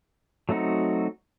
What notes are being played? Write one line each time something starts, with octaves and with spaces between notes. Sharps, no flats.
F#3 A3 C4 D#4 F#4